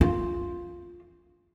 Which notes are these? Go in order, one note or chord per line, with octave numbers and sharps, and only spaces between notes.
F4